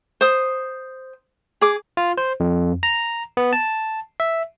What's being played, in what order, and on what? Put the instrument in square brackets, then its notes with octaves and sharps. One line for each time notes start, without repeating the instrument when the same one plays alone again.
[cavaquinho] C5 D#6
G#4 D6
[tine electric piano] F4
C5
F2
A#5
B3
A5
E5